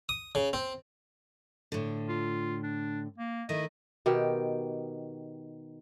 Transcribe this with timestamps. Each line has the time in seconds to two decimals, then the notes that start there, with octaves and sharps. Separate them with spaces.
0.09 D#6
0.35 C#3
0.53 C4
1.72 A2 D3
2.09 F4
2.63 D4
3.18 A#3
3.49 D#3 A3 E4 D#5
4.06 B2 D#3 G4